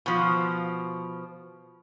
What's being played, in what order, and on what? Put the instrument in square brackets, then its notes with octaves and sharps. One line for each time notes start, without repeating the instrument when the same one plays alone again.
[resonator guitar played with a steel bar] B2 F3